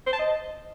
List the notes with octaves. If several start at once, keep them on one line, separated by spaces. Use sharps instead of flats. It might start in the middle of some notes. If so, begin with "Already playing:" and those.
C5
A5
D#5